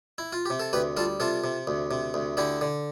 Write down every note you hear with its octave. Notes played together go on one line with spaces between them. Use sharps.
E4
F4
C3 G4
A4
D2 G4 B4
G3 F4 A4
C3 F4 A4
C3
D2
C3
D2
D3 E4 G4
D3